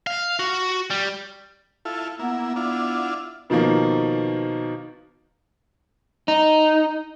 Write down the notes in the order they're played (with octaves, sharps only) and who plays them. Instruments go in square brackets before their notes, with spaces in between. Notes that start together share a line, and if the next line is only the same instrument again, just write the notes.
[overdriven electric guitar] F5
F#4
G3
[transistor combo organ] E4 F4 A4
[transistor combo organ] A#3 E4 [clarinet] B3
[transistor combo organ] D4 E4 F4
[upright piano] B2 D#3 F3 A#3
[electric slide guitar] D#4